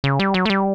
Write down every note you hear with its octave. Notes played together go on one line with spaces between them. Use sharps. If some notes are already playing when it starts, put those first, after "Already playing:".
C#3
G3
F#3
A3
G3